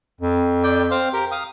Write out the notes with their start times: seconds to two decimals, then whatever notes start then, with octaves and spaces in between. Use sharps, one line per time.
0.21 F2
0.64 D5 G5
0.91 C4 C5 F5
1.13 G4 A#4
1.31 F5 D#6